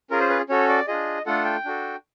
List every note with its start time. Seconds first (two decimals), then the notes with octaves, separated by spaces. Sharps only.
0.11 C#4 F4 G#4 A#4
0.20 C5
0.29 B4
0.49 C#4 F#4 A4 C#5
0.69 D5
0.87 D4 F4 G#4 D#5
1.26 A3 D4 F4 A4 F#5
1.45 G5
1.65 D4 F#4 A4